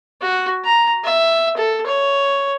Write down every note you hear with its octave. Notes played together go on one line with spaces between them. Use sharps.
F#4
A#5
E5
A4
C#5